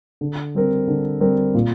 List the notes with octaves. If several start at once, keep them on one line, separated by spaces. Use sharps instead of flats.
D3
G3 C4 A#4
D3
G3 C4 A#4
A#2